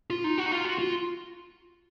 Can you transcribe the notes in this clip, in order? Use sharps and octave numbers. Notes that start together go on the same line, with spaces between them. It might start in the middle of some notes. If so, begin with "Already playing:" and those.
F4
D#4
F#4
D#4
F4
F#4
F4